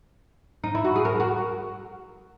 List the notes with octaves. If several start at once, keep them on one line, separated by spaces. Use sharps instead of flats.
D#4
E4
F#4
G#4
A#4
F#4